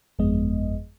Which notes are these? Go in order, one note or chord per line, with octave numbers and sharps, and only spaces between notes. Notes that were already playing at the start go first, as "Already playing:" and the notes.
G1 F2 G#3 B3 D#5